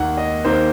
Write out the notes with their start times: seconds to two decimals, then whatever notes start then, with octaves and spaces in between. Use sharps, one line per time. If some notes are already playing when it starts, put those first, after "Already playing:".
Already playing: D#2 D#3 A#3 F#5
0.17 D#5
0.45 D#2 D#3 A#3 C5